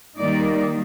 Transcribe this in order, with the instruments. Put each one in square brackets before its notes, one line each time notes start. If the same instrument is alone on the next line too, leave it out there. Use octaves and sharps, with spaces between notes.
[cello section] D#3 G3 A#3 D#4 D5